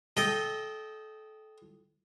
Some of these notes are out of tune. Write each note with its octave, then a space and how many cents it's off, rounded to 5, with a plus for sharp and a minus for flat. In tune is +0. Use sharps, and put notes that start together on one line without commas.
A4 -25 D#5 +0 G5 +0